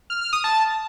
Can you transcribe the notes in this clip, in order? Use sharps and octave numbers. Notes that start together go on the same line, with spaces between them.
F6
F6
D#6
A5